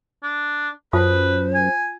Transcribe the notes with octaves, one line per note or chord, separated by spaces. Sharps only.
D4
F#2 F4 B4 C5 A5 D#6
G#5